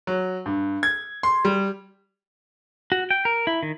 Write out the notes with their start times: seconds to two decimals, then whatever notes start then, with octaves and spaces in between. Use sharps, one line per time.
0.07 F#3
0.46 G2
0.83 G#6
1.23 C6
1.45 G3
2.92 F#4
3.10 G5
3.25 A#4
3.47 E4
3.63 D#3